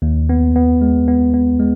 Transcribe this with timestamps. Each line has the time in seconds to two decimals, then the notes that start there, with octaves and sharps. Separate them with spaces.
0.02 D#2
0.29 B3
0.56 B3
0.82 G#3
1.08 B3
1.34 B3
1.60 G#3